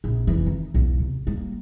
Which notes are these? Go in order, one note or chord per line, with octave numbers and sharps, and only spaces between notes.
A#1
F1 E3
D#3
B1 E2
C3
G3 A#3